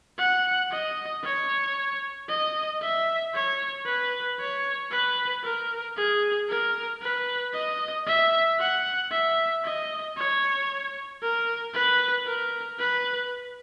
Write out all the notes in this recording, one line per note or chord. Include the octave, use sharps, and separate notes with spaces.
F#5
D#5
C#5
D#5
E5
C#5
B4
C#5
B4
A#4
G#4
A#4
B4
D#5
E5
F#5
E5
D#5
C#5
A#4
B4
A#4
B4